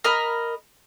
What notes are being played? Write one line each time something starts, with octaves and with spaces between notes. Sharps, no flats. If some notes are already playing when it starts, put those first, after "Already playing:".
A#4 D#5 B5